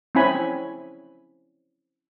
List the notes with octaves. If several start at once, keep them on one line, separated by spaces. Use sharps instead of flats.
C4 C#4 E4 G#5 B5